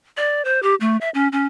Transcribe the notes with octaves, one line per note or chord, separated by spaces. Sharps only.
D5
C5
G4
A3
E5
C#4
C#4